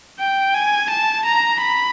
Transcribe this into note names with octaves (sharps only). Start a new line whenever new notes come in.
G5
G#5
A5
A#5
B5